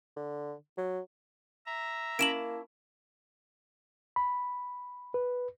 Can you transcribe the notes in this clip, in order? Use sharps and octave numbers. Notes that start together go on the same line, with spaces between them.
D3
F#3
E5 A#5
A#3 C#4 E4 A5 D7 E7 F#7
B5
B4